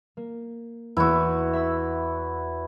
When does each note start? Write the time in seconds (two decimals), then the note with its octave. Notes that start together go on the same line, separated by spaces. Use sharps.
0.17 A#3
0.97 E2 E4 F#4
1.53 E5 B5 E6